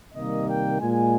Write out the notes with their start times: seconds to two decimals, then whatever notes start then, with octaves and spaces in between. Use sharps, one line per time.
0.13 C3 D#3 G3 A#3 D#5
0.46 G5
0.79 A#2 G#3 G#5